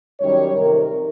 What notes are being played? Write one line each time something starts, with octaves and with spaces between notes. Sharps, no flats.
F#2 D#3 G3 C#5
F2 C3 D#3 A#4